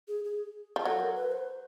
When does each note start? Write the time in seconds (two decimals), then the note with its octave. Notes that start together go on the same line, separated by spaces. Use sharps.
0.08 G#4
0.25 G#4
0.76 F3
0.85 F#3 A4
1.00 A#4
1.15 B4
1.32 C5